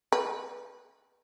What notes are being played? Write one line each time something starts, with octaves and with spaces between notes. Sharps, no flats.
B4